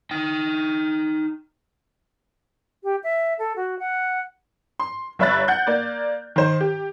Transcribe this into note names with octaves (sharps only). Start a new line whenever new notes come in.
D#4 G5
G4
E5
A4
F#4
F#5
C6
G1 C#5 E5 B5 F#6 A6
F#5 G6
A#3 D5
D#3 C5
G4